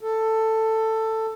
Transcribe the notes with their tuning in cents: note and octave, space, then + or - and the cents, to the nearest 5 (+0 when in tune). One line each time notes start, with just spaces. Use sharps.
A4 +10